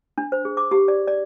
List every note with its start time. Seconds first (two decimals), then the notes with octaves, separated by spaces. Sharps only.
0.18 D4
0.32 C5
0.45 G#4
0.57 D6
0.71 G4
0.88 D5
1.08 D5